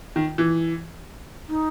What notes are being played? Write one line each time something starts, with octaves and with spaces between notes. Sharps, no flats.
D#3
E3
D#4